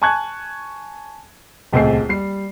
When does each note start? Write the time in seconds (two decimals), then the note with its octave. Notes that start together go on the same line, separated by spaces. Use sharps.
0.02 G#5 A5 C#6 F#6 G#6
1.73 D#1 C#2 A3 C4 G#4 C7
2.09 G3 C7